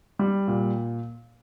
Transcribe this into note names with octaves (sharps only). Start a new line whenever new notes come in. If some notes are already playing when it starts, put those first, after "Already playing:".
G3
A#2